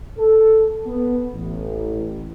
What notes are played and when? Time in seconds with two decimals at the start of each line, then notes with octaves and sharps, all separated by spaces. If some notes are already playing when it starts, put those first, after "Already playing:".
0.18 A4
0.87 B3
1.34 A1